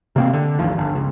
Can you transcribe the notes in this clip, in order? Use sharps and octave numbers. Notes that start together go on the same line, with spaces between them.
C3 A#3 C4
D3
A1 D#2 F3
G1
C#2